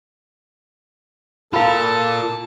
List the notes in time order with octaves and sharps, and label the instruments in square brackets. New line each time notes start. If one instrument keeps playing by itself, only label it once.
[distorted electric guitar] F4 A#4 [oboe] A4 [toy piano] F5 B5 [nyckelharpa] A5